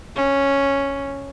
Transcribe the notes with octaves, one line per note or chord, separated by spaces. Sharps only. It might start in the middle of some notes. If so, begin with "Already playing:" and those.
C#4